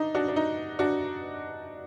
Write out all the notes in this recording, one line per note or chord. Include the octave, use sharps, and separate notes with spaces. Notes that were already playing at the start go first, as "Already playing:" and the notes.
Already playing: D4 D#4
D4 F#4
D4
D#4
D4 F#4